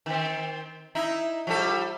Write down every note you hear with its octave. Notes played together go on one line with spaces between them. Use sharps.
D#3 C4
D#4 E4
F3 G3 A4